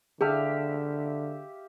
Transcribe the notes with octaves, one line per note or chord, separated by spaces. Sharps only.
D3 G4 G#4 E5 F5 A5